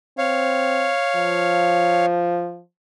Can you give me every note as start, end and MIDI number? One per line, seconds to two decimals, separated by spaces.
0.18 0.93 60
0.18 2.06 73
0.18 2.06 77
1.16 2.60 53